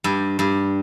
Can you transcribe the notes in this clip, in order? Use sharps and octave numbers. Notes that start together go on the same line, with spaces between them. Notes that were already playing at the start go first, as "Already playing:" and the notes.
G2
G2